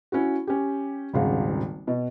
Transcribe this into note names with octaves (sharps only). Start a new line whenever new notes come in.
C#4 E4 F#4
C#4 G4
D#1 G#1 C#3 F5 F#5
B2